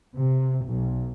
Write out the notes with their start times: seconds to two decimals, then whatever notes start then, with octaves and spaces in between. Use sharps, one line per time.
0.15 C3
0.65 B1